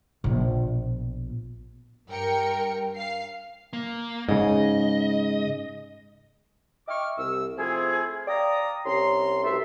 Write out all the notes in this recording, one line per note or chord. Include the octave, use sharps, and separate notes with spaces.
A#1 B2
G2 A#4 G5 C#7
F5 C7
A#3
G#2 C#3 D#5
D#5 E5 G5 C#6 D6 F6
C2 E6
F3 A3 C4 E4 F4 G#4
D5 F5 G5 A#5 D#6
C2 C#4 A#5 C6
C2 B2 A3 E5